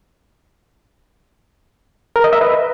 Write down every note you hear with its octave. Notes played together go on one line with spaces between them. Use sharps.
A#4
D#5
E5
B4